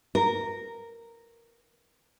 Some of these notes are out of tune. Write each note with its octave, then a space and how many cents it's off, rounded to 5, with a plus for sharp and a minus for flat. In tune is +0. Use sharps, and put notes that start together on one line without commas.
A#4 -10